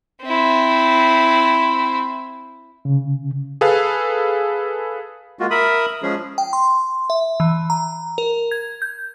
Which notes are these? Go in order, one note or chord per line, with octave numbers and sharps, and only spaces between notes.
C4 E4
C#3
G#4 A4 B4 F5
G#3 A#3 F4 F#4
A#4 E5 B5 D#6
F3 G#3 C#4 G#4
G5
C6
E5
E3
A#5
A#4
G#6
G6